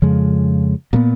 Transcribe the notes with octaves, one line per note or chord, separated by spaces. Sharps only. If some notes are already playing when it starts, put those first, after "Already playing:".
F2 C#3 F3 G#3
A#2 F#3 B3